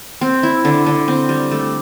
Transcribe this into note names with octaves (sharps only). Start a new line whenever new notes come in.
C4
E4
D3
D3
C4
G3
A3